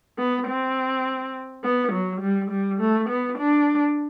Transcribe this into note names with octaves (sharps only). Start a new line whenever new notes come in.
B3
C4
B3
F#3
G3
G3
A3
B3
D4